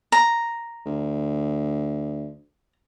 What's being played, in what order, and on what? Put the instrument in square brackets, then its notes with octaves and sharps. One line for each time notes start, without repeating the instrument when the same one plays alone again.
[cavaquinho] A#5
[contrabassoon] D2